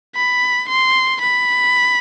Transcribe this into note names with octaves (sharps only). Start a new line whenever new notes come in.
B5
C6
B5